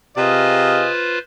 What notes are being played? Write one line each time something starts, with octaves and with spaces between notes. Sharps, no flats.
C3 F4 G#4 B4 C5 D#5 F5